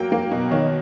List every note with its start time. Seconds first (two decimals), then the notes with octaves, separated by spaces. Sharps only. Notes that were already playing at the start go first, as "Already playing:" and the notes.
Already playing: F#3 A#3 G5
0.12 A#3
0.31 B2
0.51 D#3 C#5